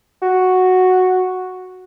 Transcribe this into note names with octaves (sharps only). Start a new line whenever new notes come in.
F#4